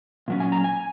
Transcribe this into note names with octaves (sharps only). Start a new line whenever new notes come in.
A#2 F#3 C#4
G#5
A#5
G#5